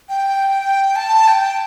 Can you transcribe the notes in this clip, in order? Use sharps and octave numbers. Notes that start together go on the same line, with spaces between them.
G5
A5
G5